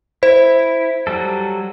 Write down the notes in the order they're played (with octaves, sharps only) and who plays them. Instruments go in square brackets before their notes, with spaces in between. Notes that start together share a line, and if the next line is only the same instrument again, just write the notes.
[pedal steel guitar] E4 [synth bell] C5
[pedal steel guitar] F#3 G3 A4